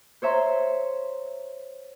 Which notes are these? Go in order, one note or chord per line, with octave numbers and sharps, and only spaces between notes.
C5 C#5 E5 A#5 C6